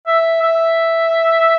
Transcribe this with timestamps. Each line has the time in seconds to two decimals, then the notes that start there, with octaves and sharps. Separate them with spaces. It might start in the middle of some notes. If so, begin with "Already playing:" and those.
0.07 E5
0.42 E5